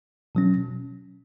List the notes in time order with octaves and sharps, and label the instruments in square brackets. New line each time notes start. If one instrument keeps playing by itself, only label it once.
[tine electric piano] B2 F#3 C#4